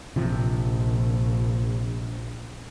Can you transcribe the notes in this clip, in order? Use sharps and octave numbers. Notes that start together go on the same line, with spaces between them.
A#1 C3 F3